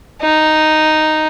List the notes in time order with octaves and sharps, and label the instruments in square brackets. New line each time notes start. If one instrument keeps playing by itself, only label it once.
[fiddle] D#4